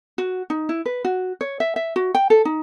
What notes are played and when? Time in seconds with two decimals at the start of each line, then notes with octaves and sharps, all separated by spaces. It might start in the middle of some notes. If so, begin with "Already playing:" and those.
0.18 F#4
0.50 D#4
0.69 E4
0.86 B4
1.05 F#4
1.41 C#5
1.60 E5
1.76 E5
1.96 F#4
2.15 G5
2.30 A4
2.45 D#4